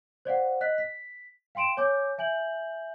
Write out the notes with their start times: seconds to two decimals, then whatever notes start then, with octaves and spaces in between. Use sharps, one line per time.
0.25 C5 D5 F5 F#5
0.61 D#5 F#6 B6
0.78 B6
1.55 F5 G5 C6 D7 E7
1.77 C#5 G#5 D6 G6
2.18 E5 G#5 G6 F#7